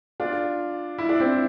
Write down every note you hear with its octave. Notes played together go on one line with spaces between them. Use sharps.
D4 F4
E4
D4
C4 E4